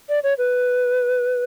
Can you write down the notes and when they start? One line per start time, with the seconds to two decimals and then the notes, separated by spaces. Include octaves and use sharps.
0.09 D5
0.23 C#5
0.38 B4